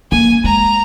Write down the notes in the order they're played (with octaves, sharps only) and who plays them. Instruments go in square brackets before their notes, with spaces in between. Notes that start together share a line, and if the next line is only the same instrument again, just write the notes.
[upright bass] A#3 [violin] G#5
[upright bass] G#3 [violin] A#5